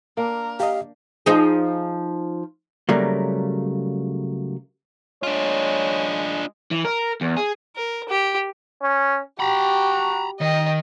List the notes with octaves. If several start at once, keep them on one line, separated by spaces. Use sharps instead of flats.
A#3 D4 A#4
G4 D#5 F5
F3 D#4 G#4
C#3 F#3 G3 A3 A#3
G#3 D4 F4 C#5
E3
A#4
E2
G#4
A#4
G4
C#4
F#4 G4 A#5 B5
D#3 D#5 G5